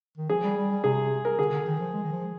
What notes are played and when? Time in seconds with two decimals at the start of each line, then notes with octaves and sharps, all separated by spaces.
0.17 D#3
0.29 F3 G#4
0.43 G3
0.57 G3
0.70 G3
0.84 C3 G#4
1.25 A#4
1.39 D3 G#4
1.52 D3
1.66 D#3
1.80 F3
1.93 G#3
2.03 D#3
2.12 F3